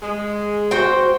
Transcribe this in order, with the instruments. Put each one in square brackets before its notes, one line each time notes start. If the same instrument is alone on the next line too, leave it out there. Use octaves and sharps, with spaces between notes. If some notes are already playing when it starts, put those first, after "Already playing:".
[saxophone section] G#3
[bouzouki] F#4 C5 G5